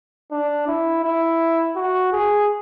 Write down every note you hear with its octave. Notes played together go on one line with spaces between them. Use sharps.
D4
E4
E4
F#4
G#4